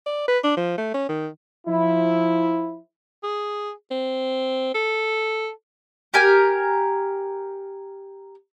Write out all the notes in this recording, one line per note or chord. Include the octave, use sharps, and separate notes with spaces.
D5
B4
D4
F3
A3
C#4
D#3
F3 E4
G#4
C4
A4
G4 A#4 G#5